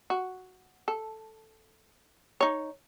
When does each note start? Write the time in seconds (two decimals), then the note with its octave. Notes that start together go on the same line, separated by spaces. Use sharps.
0.10 F#4
0.88 A4
2.40 D#4 C#5